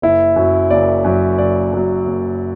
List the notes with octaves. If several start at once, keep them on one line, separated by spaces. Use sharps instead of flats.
F#1 E4
F#2 F#3
F#1 D5
F#2 F#3
F#1 D5
F#2 F#3
F#1